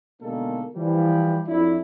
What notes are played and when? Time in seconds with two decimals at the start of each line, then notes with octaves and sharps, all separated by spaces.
0.21 B2 D3 D#3 G#3 A#3 A4
0.75 E3 F3 G3
1.46 F2 F#3 D4 E4